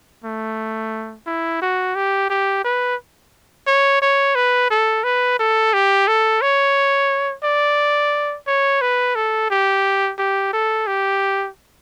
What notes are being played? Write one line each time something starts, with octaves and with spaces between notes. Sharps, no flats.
A3
E4
F#4
G4
G4
B4
C#5
C#5
B4
A4
B4
A4
G4
A4
C#5
D5
C#5
B4
A4
G4
G4
A4
G4